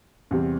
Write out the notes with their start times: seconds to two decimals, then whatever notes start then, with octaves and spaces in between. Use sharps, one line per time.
0.31 E2 C3 G3 C4